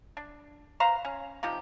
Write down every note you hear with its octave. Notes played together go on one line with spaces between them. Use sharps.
D4
B4 C5 F5 A#5
C#4
C3 F3 D#4 G4